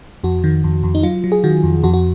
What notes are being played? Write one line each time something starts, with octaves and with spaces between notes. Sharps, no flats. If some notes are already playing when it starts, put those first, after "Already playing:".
F2 F#4
D#3
F2
F2
D#4
F#3 F4
F#3
G#4
D#3 F#4
F2
F2 F#4
F#4